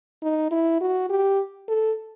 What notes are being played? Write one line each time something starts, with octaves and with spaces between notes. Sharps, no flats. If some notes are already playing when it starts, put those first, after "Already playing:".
D#4
E4
F#4
G4
A4